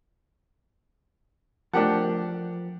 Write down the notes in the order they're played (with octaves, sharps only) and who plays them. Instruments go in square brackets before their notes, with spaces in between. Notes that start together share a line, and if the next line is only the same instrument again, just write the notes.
[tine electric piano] F3 [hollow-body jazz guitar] A3 A#4 A5 [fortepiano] D4 G4 F#5